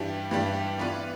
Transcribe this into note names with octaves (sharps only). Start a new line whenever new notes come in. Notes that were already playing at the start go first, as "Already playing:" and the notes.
Already playing: G2 E3 G3 D4 G4
G2 E3 G3 D4 G4
E3 B3 F4 B4 D5